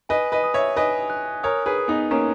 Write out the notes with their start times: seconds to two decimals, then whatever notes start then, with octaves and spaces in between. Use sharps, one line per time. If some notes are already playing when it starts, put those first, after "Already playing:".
0.09 B4 D#5 G#5
0.32 B4 D#5
0.44 D#6
0.54 C#5 E5
0.76 B4 D#5 G#5
1.10 F#6
1.43 A#4 C#5 D#6
1.66 G#4 B4
1.78 D#6
1.88 B3 D#4
2.11 A#3 C#4 A#5